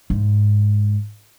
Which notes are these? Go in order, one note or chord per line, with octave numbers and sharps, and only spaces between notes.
G#2